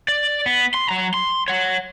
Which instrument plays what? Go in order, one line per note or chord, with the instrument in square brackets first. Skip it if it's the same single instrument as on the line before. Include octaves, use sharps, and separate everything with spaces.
[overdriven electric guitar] D5
B3
C6
F#3 A#5
C6
C#5 F#5